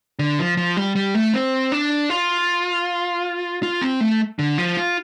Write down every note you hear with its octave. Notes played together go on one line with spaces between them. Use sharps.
D3
F3
F3
G3
G3
A3
C4
D4
F4
F4
C4
A3
D3
F3
F4